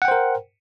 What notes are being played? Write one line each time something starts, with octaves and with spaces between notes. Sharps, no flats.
A#4 C5 F#5 G5